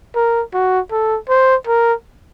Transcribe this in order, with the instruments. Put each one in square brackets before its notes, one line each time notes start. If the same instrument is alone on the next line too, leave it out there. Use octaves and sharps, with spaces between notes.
[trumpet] A#4
F#4
A4
C5
A#4